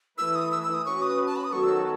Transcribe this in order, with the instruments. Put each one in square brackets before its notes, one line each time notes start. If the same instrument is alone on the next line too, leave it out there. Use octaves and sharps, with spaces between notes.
[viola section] E3 A3 E4 B4 [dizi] E6
[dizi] D#6
E6
E6
D#6
[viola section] C#4 F#4 B4 [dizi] C#6
[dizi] D#6
A5
B5
D#6
[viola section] D#3 F#3 B3 F#4 A4 [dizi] C#6
[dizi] E6